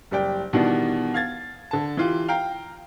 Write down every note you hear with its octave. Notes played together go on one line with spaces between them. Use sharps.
F#1 G3 D5 G5
B2 D#3 E3 G3 B3 D4
F5 G#6 A6
D3 A5
E3 F4 G4
F5 G5 A#5